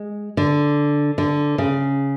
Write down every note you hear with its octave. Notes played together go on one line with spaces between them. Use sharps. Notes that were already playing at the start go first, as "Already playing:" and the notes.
Already playing: G#3
D3
D3
C#3